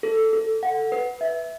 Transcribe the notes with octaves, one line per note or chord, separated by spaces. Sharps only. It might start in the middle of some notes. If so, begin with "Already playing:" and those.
A4
A4
F#5
B4
E5